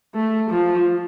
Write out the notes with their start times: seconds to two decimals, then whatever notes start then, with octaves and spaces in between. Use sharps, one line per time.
0.15 A3
0.50 F3